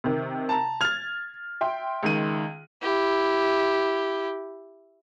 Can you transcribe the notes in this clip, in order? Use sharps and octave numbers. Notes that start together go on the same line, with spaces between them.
C3 D#3
A5 A#5
F6 G#6 A6 F7
E5 G5 C6
C#2 D#3 D#7
E4 G4